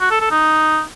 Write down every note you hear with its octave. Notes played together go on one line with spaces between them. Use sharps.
F#4
A4
A4
D#4